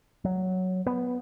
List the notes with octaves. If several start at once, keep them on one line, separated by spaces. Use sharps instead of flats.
F#3
B3